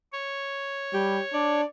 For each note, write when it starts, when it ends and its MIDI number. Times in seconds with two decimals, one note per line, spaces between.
0.12 1.61 73
0.93 1.18 55
0.93 1.21 67
1.34 1.63 62
1.34 1.65 74